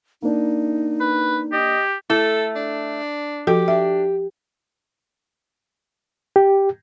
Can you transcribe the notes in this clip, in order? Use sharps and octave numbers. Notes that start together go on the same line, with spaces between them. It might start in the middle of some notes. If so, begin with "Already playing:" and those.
A#3 D4 D#4
B4
G4 D#5
A3 E4 A4
D4
F3 F#4 G4 A4
D4 E5
G4